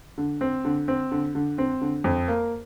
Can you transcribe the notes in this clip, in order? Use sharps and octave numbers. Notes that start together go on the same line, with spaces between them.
D3
C4
D3
C4
D3
D3
C4
D3
F2
A#3